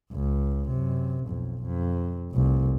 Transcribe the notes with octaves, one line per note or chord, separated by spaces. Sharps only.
C#2
F#2 C3
B1 F2
F2
F1 C2